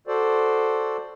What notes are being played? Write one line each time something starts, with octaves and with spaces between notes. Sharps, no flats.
F#4 A4 C5 D5